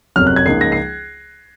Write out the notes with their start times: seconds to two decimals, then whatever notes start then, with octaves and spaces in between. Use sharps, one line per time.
0.16 F#1 F2 C3 F#3 F6
0.27 F#6
0.36 G#6
0.46 C#2 C#3 F3 A#3 D#4 C7
0.61 A#6
0.72 C7